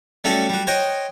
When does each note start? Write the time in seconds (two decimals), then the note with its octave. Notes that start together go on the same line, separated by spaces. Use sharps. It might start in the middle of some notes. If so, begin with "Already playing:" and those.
0.24 G3 A3 C#4 F#4 A4
0.49 G3 F#4
0.67 C5 C#5 D#5 F#5 G5